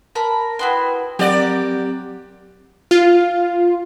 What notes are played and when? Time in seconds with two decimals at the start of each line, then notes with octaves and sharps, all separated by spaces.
0.15 A#4 A5 B5
0.59 E4 F#4 B4 G5 C6 D#6
1.19 F#3 C4 F#4 G4 A#4 D5
2.91 F4